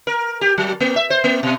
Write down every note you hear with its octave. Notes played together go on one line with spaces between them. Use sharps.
A#4
G4
F#3
A#3
E5
C5
A#3
B2